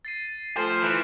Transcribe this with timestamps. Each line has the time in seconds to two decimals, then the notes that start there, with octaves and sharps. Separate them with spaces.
0.05 A6 C7 D#7
0.57 F3 A3 C5
0.82 E3 F#6 D7 E7